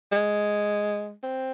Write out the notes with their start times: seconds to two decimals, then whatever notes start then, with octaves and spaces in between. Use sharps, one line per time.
0.12 G#3
1.23 C4